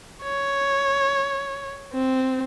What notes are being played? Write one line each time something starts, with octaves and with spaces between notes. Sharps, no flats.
C#5
C4